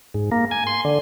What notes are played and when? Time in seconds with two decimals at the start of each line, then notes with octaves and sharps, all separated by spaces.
0.14 G#2
0.32 A#3
0.51 G#5
0.67 C6
0.85 D3